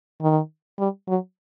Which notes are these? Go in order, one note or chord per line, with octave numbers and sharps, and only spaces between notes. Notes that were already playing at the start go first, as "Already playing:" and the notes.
D#3
G3
F#3